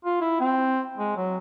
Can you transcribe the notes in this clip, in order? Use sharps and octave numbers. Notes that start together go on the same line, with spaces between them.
F4
E4
C4
G#3
F#3